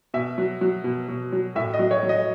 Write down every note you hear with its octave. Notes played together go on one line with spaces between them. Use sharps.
B2 E5
F#3
F#3
B2
B2
F#3
A2 E5
D#5
F#3
C#5
F#3
D#5